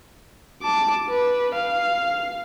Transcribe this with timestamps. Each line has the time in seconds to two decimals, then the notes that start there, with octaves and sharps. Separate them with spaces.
0.63 A5 D6
1.10 B4
1.55 F5